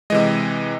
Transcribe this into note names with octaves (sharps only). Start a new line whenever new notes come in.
C3 E3 G#3 D#5